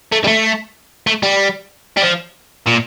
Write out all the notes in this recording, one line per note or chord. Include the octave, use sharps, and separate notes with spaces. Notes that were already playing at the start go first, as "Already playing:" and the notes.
A3
G3
A3
A3
G3
G3
F3
A#2